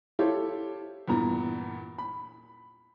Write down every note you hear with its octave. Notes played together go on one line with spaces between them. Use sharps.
E4 F4 G4 A4 C5 C#5
E2 G2 A#2 A#5
B5